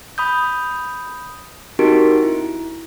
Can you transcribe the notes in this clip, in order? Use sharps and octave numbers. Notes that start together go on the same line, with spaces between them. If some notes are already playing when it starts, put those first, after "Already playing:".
B5 D#6 G6
C4 D#4 F#4 G4 A#4 D7
E4